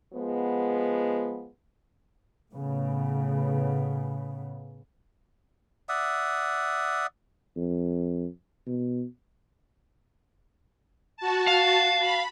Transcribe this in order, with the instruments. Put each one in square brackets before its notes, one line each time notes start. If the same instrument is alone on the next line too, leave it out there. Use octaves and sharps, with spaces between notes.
[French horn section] F3 G#3 B3
[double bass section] A2 C#3 B3
[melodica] D5 E5 F#5 D#6
[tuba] F2
B2
[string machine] F#4 A5
[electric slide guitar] F5
[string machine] B5